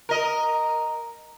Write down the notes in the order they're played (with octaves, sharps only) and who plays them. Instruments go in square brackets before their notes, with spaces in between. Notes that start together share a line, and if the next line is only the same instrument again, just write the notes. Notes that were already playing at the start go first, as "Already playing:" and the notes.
[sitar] A#4 D#5